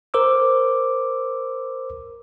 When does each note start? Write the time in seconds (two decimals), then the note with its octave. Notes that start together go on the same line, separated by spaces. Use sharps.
0.14 A#4 C5 D6 E6